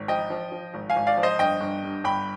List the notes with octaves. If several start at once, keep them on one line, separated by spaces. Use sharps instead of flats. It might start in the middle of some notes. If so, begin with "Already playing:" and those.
Already playing: G#1
F3 D#5 G5
F3
F3
G#1
F5 G#5
G#1
D5 F5
F3
C5 D#5
G1 D#5 G5
G1
G2
G1 G5 B5